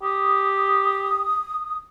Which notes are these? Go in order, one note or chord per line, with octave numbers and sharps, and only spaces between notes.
G4 D#6